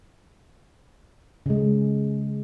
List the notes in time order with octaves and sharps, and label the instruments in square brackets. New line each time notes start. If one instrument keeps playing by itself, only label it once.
[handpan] C#3 G#3